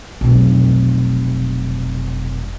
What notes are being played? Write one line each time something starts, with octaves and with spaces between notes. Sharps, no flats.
F1 B1